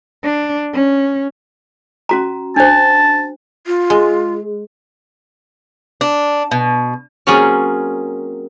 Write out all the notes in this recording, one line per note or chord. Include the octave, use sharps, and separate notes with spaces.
D4
C#4
C#4 F#4 A#5
D4 C5 A5
F4
G#3
D4
B2
F#3 A#3 C4 C#4 F4 G#4